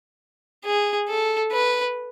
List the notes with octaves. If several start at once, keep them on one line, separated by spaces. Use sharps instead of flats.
G#4
A4
B4